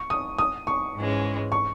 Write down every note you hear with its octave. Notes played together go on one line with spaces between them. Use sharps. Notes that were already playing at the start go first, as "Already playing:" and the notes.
Already playing: C#6
D#6
D#6
C#6
G#2 E3 G#3 C#4
C#6